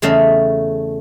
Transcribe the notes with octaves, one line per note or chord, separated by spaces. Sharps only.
E2 C#3 A3 D#5 F5